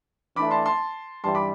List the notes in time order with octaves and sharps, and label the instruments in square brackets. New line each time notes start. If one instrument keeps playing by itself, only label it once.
[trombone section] E3 A3 D4 [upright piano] B5 D6
[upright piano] A5 C6
A5 C6
[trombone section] G2 E3 G3 [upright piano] A5 C6
[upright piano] B5 D6